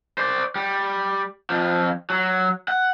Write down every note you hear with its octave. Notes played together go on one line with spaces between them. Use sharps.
C5 D5
G3
F2 F3
F#3
F#5